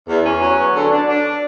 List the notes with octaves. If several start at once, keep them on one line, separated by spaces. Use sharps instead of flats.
E2
C#4
F#3
B3
D3
D4
D4